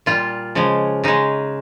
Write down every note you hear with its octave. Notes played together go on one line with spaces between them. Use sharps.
A#2 G3 F4
C#3 F3 G#3
C#3 G#3 D#4